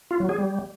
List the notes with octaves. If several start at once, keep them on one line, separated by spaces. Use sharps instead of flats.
F4
F#3
G#4
G3